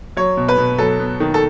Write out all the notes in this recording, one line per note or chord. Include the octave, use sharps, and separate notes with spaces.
F#3 C#5
B2
B4
B2
F#3 A4
B3
D#3
A4